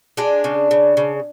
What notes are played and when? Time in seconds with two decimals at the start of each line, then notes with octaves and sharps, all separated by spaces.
0.17 G#3 D4
0.44 C#3
0.71 C#3
0.97 C#3